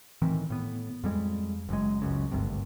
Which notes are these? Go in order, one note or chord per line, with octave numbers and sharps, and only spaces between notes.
A2 D#3 E3 C4
A2 B3
F2 G3 G#3
F#1 F#2 G#3
C#2 F#2 C#3
G#1 D2 G2 C3